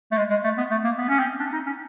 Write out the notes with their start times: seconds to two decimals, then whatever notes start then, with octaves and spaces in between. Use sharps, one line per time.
0.12 A3
0.17 G#3
0.30 G#3
0.44 A3
0.58 B3
0.71 A3
0.84 A#3
0.98 B3
1.09 C#4
1.19 C4
1.40 D4
1.53 D#4
1.66 C#4